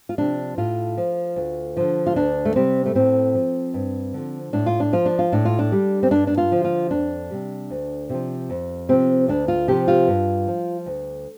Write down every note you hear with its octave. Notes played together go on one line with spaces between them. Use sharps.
F4
C3 F3 D4
A2 F4
F3
D2
D3 F3
F4
D2 D4
A3
C3 G3 C4
A3
A2 C4
F3
G2
D3 F3
A2 D4
F4
D4
F3 F4
D4
F4
A2 D4
F4
D4
G3
C4
G2 D4
D4
F4
D3 F3
F4
F2 D4
C3 G3
D2
C3 F3
F2
C3 F3 C4
D2 D4
F4
C3 F3 G4
F4
G2
F3
D2